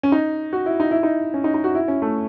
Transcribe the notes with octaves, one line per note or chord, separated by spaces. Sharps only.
C#4
D#4
F#4
E4
D#4
E4
D#4
C#4
D#4
D#4
F#4
E4
C#4
A3